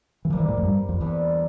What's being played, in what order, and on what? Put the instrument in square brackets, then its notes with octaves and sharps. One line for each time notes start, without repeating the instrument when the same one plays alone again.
[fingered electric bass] E3
[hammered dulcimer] C3 G3 A#3 [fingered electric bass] F3
[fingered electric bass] E3
A2
F2
G2
F2
[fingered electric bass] E2 [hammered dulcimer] G2 D3 G3 C4